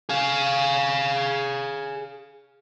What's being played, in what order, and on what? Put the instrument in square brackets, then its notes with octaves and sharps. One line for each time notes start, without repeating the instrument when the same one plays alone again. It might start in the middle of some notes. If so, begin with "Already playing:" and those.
[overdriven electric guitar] G#4 F5